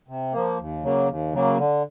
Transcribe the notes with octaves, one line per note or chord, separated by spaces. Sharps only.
C3
F3 A#3
D#2
C#3 F#3 A#3
D#2
C#3 F#3 A#3
D3